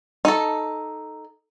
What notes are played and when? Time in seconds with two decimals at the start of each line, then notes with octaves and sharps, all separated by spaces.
0.25 D#4 A4